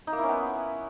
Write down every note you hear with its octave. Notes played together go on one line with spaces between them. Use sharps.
D#4
A#3
E4
C#4
B3